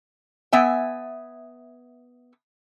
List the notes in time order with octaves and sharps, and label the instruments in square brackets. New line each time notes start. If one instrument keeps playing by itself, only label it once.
[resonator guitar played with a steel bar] B3 E5 G#5